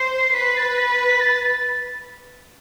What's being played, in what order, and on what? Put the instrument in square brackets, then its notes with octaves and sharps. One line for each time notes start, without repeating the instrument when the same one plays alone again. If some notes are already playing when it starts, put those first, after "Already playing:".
Already playing: [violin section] C5 [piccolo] C7
[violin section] B4 [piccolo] B6
[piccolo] A6
B6
B6
B6
A6